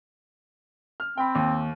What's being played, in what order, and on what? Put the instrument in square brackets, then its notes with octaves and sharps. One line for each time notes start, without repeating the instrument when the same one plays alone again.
[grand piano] F6
[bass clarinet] C4 [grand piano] G5 B5
[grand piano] D#2